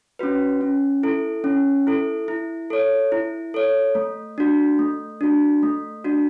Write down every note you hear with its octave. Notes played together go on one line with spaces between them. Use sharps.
C#4 F#4 B4
C#4
E4 A4
C#4
E4 A4
E4
A4 C#5
E4
A4 C#5
A3
D4 F#4
A3
D4 F#4
A3
D4 F#4